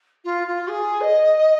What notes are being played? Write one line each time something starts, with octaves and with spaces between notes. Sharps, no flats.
F4
F4
G#4
D#5